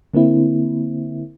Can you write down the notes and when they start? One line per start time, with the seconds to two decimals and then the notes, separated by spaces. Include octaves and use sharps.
0.14 D3 A#3 C4 E4